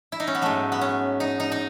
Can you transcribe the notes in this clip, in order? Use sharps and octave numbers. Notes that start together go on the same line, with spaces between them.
E4
D#4
C#4
B3
G#2 F#3 A3
B3
C#4
D#4
D#4
D#4